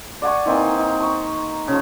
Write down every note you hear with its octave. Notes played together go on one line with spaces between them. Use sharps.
D5 F#5 G#5 C#6
E3 A#3 C4 D#4
D#4
A#5 C#6
C#3 F3